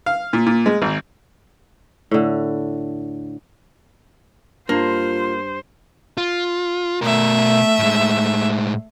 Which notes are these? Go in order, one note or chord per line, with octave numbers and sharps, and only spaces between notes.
F5
A#2
A#2
G#3
G#1
A2 D3
G2 A#3 F4 C5
F4
B2 A3 A#4 E5
A2 G#3